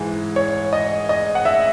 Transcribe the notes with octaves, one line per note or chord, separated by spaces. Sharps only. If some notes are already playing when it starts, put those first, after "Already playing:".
Already playing: G#2 E3
C#5
D#5
D#5
F#5
E5